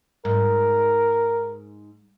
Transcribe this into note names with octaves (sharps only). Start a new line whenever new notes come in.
G#2 A#4